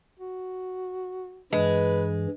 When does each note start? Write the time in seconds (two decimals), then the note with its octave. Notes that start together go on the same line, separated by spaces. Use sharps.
0.20 F#4
1.53 G2 E3 G#3 B4